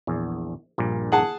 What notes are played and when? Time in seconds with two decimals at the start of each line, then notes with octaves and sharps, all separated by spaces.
0.07 A#1 E2
0.78 A#1 G2 A#2
1.12 G#4 F#5 A5